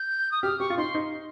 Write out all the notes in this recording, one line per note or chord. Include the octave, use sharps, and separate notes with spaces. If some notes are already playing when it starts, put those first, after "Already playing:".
Already playing: G6
D#6
G4 F6
G4 C#6
F4
D#4 C6
D#4